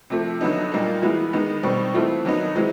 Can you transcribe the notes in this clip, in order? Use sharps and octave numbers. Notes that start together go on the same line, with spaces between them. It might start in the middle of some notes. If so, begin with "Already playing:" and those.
C3 F3 A3
D3 F#3 B3 D#4
A#2 G3 A#3 D#4
E3 G#3 B3 E4
D#3 G#3 B3 D#4
B2 G3 C4 D#4
E3 A3 C4 F4
D#3 F#3 B3 D#4
E3 G#3 C4